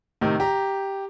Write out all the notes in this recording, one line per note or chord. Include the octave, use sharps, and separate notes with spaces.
A2 C3 D#3
G4 A#5